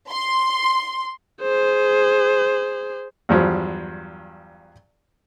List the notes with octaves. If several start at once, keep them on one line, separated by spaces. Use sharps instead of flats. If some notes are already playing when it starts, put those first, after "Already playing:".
C6
G#4 C5
E2 G2 F3 F#3